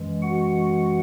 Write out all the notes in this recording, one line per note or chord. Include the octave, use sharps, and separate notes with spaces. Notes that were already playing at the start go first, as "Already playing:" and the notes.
Already playing: F#2 E3 G#3
F#4 F#5